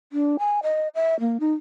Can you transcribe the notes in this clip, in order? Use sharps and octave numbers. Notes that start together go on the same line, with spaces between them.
D4
G#5
D#5
E5
A#3
D#4